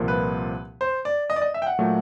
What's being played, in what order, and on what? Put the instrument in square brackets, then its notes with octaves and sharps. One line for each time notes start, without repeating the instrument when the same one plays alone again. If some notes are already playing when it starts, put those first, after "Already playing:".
Already playing: [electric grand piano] C2 A#2 F3 A#3
[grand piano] B4
C5
D5
D#5
D5
D#5
E5
G5
F#5
[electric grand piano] A#2 F#3 A3